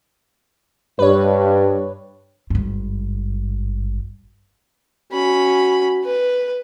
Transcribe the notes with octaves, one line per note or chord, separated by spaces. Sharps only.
G2 B4 C#5
G#1 G2
C#4 F#4 B5
B4